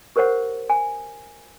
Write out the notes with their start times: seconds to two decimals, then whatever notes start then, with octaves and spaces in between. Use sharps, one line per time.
0.16 G4 A#4 C5 C#5 F#5
0.70 G#5